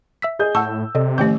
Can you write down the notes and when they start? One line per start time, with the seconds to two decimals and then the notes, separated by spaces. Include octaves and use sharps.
0.22 E5 E6 B6
0.39 G#4 D#5 G6
0.55 A2 F#5 A5 C#6 E6
0.95 C3 A4 D5 D#5
1.18 A1 D#3 F3 A3 G4 G5 G6